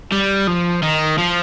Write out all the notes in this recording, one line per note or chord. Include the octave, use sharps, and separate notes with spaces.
G3
F3
D#3
F3